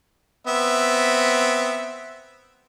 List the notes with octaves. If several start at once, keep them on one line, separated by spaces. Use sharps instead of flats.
B3 C4 E5